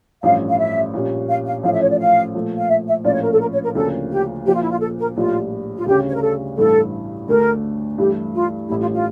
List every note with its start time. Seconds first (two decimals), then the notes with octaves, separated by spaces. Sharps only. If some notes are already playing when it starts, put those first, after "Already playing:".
0.23 A1 G2 F3 C#4 F5
0.49 F5
0.58 E5
0.94 A#1 A#2 G3 C#4
1.29 F5
1.46 F5
1.63 A1 A2 F3 C#4 F4 F5
1.73 E5
1.82 C#5
1.90 D5
1.99 F5
2.35 A#2 F3 A3
2.57 F5
2.69 E5
2.87 E5
3.04 A#1 A2 F3 C#4 F4 D5
3.14 C#5
3.23 A#4
3.32 A4
3.40 A#4
3.52 C#5
3.64 A#4
3.75 D2 C#3 F3 A#3 C#4 A4
4.11 G4
4.46 A#1 A#2 F3 G4
4.54 F4
4.62 E4
4.70 F4
4.81 A4
4.99 A#4
5.16 A#1 A2 G3 F4
5.77 F4
5.86 D2 C#3 G3 C#4 G4
6.08 C#5
6.14 A#4
6.22 A4
6.57 A1 G2 E3 A3 A4
7.28 D2 D3 A3 D4 A#4
7.98 G2 E3 A3 E4 G4
8.34 F4
8.69 A1 A2 G3 E4
8.80 F4
8.93 F4